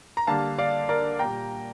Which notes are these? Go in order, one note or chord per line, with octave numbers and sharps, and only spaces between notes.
A#5
D3 G3 A#3 F5 A5
D5 F5
A#4 D5
A#2 G3 A#3 G5 A#5